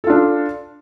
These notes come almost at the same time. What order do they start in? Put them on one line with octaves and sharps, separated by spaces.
A4 F4 D4